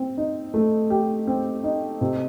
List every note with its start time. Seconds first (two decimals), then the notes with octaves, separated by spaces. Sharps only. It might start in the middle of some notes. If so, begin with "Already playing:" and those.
Already playing: C4
0.17 D#4
0.54 A3
0.90 G4
1.27 C4
1.64 D#4
2.01 C3